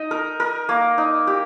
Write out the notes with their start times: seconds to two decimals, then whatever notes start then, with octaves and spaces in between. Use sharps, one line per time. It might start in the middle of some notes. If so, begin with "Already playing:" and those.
Already playing: D#4 D#5
0.11 A#4
0.40 A#4
0.69 A#3
0.98 D#4
1.27 G4